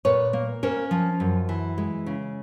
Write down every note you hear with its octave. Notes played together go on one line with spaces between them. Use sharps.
A#2 B4 C#5
A#3
C#4 A#4 C5
F3
F#2
E3
G#3
C#3